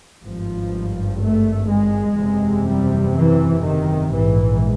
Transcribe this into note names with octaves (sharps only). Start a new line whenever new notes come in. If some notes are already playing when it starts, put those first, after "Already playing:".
G#1 G2 F3
A3
G#3
F#1 E2 C3
G3
E3
D#3
A#1 G#2 E3